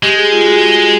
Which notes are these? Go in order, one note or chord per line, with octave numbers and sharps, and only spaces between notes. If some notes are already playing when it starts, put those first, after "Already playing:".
G#3 G4
G#4
F4
F#4
G#4